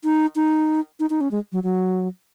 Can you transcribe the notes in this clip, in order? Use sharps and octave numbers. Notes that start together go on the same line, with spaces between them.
D#4
D#4
D#4
D#4
C#4
G#3
F#3
F#3